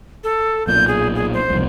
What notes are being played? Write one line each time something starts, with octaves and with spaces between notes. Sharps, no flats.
A4
B1 A#2 G6
G#4
G#4
C5
E1 C2 F2